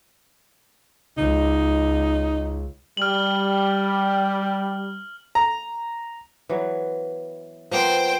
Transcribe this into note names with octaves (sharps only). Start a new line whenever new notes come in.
C#2 D#4
G3 F6 F#7
A#5
E3 F#3 B3
F3 A#3 B3 C5 G5